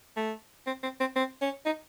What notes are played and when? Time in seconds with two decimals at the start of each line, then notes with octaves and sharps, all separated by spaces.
0.16 A3
0.66 C4
0.83 C4
1.00 C4
1.16 C4
1.41 C#4
1.66 D#4